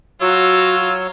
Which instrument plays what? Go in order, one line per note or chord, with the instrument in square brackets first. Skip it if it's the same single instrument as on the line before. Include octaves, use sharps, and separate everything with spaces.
[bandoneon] F#3 C#5 [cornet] F4 [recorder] F#4 [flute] E6